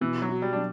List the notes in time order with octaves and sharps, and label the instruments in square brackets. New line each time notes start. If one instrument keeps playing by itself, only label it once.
[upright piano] B2 [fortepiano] E3
[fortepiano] F#3
[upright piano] F#4
[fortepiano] G3
[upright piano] F#3 [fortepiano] D4